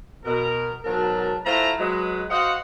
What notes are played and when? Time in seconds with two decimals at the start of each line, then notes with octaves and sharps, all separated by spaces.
0.24 B2 A#4
0.84 G#2 B2 F#3 A#4 A5
1.45 A3 E4 F4 C5 F#5 A#5
1.79 F#3 G#3 B4
2.30 F#4 C5 D#5 F5 F#5